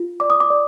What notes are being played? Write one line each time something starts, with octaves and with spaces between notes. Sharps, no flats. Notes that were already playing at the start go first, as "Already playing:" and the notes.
Already playing: F4
D5 D6
D#6
D6
D5